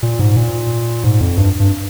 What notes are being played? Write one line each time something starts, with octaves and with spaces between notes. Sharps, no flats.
A#2
G#2
A#2
G#2
F2
G2
G2